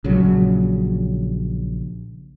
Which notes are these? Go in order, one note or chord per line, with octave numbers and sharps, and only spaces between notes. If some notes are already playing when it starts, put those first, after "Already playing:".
A#1 C#3 F#3